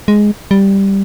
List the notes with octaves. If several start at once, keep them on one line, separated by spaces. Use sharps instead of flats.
G#3
G3